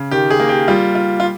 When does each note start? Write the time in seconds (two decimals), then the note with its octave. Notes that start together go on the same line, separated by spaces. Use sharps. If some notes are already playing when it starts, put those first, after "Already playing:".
Already playing: C#3
0.11 D#3 G4
0.30 G#4
0.40 A#3
0.49 G4
0.68 G3 F4
0.95 F4
1.20 F4